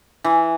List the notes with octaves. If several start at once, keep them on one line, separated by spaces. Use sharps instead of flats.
E3